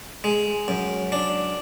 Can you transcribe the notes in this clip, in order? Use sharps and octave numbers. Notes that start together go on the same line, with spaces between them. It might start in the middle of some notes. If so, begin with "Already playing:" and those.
G#3
F#2
D4